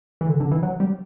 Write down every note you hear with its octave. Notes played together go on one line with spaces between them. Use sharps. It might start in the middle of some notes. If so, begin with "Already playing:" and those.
E3
D3
D3
E3
F#3
G3